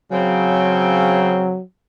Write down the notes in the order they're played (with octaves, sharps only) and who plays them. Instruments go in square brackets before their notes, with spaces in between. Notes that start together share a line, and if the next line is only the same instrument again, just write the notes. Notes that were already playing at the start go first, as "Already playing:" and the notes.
[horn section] C#3 C4 [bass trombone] F#3